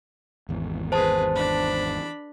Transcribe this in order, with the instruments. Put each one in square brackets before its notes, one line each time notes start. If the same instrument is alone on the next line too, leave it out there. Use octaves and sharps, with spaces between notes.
[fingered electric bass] G#1 E2
[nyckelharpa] G#4 B4 [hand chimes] C5 A5
[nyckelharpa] D4 B5